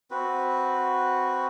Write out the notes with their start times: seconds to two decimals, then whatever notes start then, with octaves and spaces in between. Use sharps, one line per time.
0.11 C4 F#4 B4